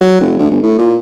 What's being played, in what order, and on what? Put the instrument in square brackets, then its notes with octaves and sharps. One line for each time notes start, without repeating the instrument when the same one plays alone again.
[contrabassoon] F#3
F1
D2
G1
A2
A#2